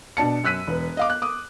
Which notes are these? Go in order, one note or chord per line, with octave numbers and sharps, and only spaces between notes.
B2 D4 A5 C#7
F#2 E6 F#6 B6 D#7
E1 B4
D#5 F5 D6
F#6
D6 D#6